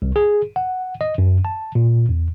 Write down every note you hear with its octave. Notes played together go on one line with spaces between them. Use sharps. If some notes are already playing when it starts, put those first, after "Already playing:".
C2
G#4
F#5
D#5
F#2
A5
A#2
E2